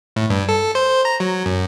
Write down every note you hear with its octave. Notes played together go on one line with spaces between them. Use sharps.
A2
G2
A4
C5
A#5
F#3
F#2